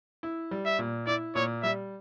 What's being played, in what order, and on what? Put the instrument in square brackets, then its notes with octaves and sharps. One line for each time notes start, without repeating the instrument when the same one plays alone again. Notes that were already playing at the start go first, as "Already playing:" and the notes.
[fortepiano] E4
G3
[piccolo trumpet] E5
[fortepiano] A#2
[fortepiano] E4 [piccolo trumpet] D5
[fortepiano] A#2 [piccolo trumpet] C#5
[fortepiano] G3 [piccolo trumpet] E5